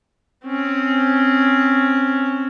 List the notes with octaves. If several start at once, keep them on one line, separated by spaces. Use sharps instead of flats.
C4 C#4